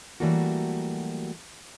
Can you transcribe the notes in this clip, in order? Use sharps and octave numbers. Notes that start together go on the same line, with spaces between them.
E3 F#3 G3 A3 A#3 F#4